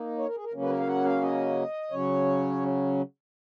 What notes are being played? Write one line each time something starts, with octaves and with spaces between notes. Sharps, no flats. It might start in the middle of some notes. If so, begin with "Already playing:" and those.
Already playing: A#3 D#4
C#5
A#4
G#4
A#4
C#3 F#3 A#3 C#4
B4
A#4
F5
F#5
F5
D#5
C#3 F#3 C#4 C#5